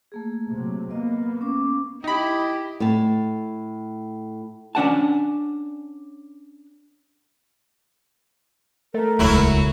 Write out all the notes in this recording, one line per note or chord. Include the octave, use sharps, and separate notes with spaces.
A3 A#3 G#4
C3 F#3
A#3 B3 D#5
C#4 D6
D#4 E4 G4 D#5 B5
A2 A5
C#4 D4 F#5 A5
A3 A#4
D#1 C#2 F#3 E4 F#4